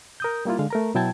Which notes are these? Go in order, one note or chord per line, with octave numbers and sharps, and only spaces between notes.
A#4 D#6 G6
G3 A#3 E4 F4
D3 G#3 F5
A3 A#4 A#5
B2 F#3 E4 G5 A5 G#6